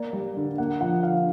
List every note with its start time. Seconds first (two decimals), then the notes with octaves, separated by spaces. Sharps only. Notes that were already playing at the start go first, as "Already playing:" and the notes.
Already playing: A#3 D5
0.13 G3
0.37 D3
0.58 A#3 F#5
0.81 F3 F#5
1.03 D3 F5